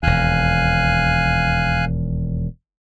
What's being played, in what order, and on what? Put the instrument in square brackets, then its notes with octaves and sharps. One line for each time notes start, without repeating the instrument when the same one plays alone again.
[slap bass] E1 D#2 [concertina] F5 G#5 F#6